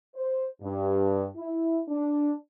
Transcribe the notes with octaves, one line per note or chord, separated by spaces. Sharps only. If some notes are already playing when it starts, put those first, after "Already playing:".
C5
G2
E4
D4